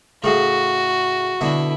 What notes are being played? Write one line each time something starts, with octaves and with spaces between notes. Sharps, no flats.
A2 C#3 F#4
B2 D3 E4